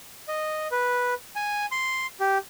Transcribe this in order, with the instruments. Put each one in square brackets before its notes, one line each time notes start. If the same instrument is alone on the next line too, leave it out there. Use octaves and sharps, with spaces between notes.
[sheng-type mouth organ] D#5
B4
G#5
C6
G4